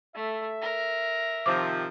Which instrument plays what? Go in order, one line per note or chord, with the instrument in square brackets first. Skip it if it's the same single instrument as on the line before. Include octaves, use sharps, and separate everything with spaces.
[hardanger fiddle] A3 [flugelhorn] E5
[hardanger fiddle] A#4
[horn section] C3 D#3 F3 [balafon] D6